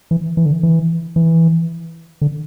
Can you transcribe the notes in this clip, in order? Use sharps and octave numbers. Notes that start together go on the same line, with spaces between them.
E3
E3
D3
E3
E3
D3